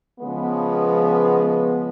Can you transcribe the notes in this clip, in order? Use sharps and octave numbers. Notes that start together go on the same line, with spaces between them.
C#3 F3 G#3 B3